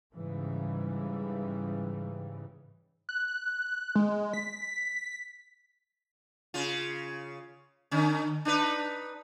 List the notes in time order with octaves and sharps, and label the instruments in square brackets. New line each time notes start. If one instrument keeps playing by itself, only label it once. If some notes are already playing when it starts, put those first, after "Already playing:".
[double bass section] G#2 C#3 E3 G3
[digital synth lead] F#6
F#6
G#3
B6
[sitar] C#3 F4
D3 C#4
D4 D#4 B4